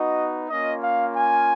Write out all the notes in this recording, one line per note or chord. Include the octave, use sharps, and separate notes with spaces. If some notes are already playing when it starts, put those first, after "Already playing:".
Already playing: B3 D#4 F#4 D#5
A#3 C#4 F4 D#5
F5
G#5